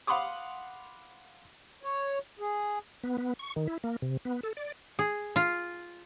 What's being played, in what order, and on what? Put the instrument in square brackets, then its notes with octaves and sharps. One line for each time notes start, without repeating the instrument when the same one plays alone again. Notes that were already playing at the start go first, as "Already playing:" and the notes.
[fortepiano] F5 F#5 B5 C6 D6 D#6
[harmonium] C#5
G#4
[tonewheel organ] B3
B3
C#6
D#3
E4
A#3
C3
B3
A4
D5
[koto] G#4
F4